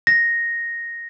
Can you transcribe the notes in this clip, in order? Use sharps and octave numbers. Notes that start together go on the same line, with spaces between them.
A#6